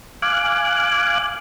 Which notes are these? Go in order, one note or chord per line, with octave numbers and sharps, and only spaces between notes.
F5 G#5 D6 F#6